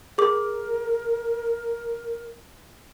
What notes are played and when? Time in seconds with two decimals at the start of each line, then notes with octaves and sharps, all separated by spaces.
0.18 G#4 A#4 D6